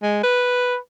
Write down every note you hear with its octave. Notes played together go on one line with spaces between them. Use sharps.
G#3
B4